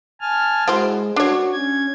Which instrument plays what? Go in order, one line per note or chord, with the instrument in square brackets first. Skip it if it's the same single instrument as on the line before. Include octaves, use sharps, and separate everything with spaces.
[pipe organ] G#5 A5 F6
[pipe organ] G#3 [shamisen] E4 F#4 C5
[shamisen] D4 C#5 [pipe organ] F#4
[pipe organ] C#4 G#6